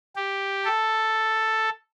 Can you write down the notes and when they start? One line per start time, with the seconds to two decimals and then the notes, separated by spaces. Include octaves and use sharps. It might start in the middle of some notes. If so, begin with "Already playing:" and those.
0.16 G4
0.65 A4